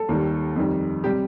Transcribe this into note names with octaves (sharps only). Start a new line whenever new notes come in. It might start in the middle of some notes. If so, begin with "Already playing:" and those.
Already playing: A4
D#2 D#3 G3
F2 D#3 G3
C3 G3 G4